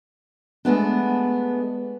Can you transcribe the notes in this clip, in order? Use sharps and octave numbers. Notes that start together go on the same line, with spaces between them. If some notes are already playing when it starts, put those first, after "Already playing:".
G#3 A3 B3 D4